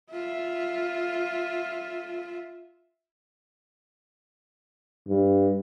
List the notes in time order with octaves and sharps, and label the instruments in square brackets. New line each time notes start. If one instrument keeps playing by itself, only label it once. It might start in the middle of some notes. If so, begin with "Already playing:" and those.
[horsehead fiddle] F4 E5
[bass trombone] G2